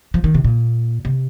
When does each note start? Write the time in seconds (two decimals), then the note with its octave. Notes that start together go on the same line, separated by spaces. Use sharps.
0.14 F3
0.24 D#3
0.34 C3
0.44 A#2
1.05 C3